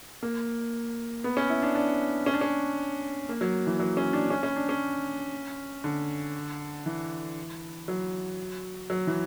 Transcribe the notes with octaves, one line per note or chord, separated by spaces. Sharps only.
A#3
B3
C#4
E4
D4
D4
C#4
D4
C#4
A#3
F#3
E3
F#3
C#4
D4
C#4
C#4
D4
C#4
D3
E3
F#3
F#3
E3